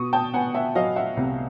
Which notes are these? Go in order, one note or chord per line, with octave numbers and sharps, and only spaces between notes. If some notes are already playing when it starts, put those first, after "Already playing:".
Already playing: B2 C#6 D#6
G5 A5
B3 F#5 G#5
E5
F#3 D#5 F5
E5 F#5
C2